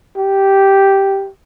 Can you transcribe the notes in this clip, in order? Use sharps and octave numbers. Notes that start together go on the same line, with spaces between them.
G4